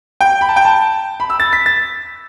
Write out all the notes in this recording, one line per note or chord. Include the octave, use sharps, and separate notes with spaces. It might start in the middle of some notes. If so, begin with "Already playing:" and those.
G5
B5
A5
G5
A5
B5
E6
A6
B6
A6